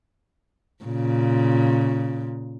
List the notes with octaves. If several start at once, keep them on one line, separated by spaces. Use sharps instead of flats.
A#2 C#3